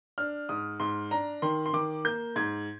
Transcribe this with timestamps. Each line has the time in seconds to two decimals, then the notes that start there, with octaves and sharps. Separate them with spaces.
0.18 D4 F6
0.49 G#2 D#6
0.80 G#2 C6
1.11 D4 A#5
1.42 D#3 C6
1.66 C6
1.73 D#3 D6
2.05 A#3 G6
2.36 G#2 G#6